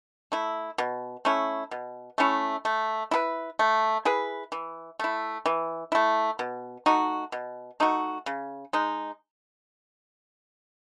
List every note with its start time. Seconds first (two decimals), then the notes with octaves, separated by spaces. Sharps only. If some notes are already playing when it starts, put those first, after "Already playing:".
0.32 A3 E4
0.78 B2
1.25 A3 C#4 E4
1.71 B2
2.18 A3 C#4 E4
2.65 A3
3.11 E4 G#4 B4
3.59 A3
4.05 E4 G#4 B4
4.52 E3
4.99 A3 E4
5.46 E3
5.92 A3 E4
6.39 B2
6.86 A3 D#4 F#4
7.32 B2
7.80 A3 D#4 F#4
8.26 C#3
8.73 G#3 D#4